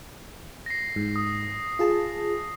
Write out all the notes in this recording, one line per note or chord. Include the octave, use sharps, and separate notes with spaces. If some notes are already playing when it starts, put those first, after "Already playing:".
A#6 C7
G#2
D#6
F4 G#4 A5